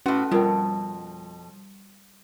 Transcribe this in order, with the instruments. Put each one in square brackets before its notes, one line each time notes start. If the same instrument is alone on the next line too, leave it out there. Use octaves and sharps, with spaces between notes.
[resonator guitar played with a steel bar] A2 F#4 [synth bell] C#4
[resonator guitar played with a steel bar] F2 B2 [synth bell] G3 [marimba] F4 A#4 G5